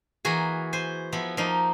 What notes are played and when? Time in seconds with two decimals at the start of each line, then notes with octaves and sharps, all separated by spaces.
0.25 E3 A#3 F#4 G#4
0.73 C5 G#5
1.13 F3 B3 E4
1.37 F3 A#3 D#4